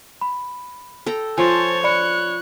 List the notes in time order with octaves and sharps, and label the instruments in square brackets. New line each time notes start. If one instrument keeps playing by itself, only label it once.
[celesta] B5
[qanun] A4 G5 A#5
[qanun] F3 [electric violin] C5 A5 [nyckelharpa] C#5 [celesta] G#5 C6
[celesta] D5 B5 C#7 [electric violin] F#6